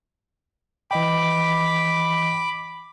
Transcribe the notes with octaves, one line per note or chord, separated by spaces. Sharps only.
E3 D#5 G5 B5 D6